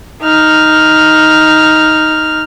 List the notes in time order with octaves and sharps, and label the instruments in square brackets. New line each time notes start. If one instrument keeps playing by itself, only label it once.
[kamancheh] D#4 F6